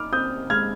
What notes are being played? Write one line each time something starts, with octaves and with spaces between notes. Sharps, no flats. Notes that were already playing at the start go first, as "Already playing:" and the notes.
Already playing: D#4 D6 F6
C4 D#6 G6
G#3 F6 G#6